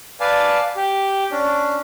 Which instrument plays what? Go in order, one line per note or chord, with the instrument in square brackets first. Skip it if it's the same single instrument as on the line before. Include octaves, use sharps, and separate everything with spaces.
[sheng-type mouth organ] B4 D5 F5 G#5 A5
G4
C#4 D4